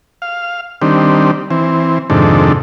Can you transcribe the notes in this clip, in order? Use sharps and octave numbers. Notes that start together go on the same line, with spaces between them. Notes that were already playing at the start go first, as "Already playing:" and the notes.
F5
D#3 G3 C4 D4
E3 C4
F2 G#2 C3 D#3 D4 A4